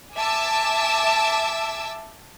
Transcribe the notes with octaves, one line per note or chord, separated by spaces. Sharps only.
E5 G#5 A5 D6 E6